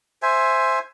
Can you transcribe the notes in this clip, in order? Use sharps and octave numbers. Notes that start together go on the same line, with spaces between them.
C5 E5 G#5